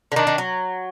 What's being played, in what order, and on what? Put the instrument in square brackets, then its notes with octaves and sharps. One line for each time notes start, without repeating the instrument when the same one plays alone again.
[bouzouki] D3
[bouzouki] D#3 [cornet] D4
[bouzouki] D#3
F#3